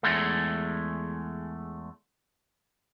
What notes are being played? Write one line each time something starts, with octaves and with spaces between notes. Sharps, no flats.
E2 G#3 A3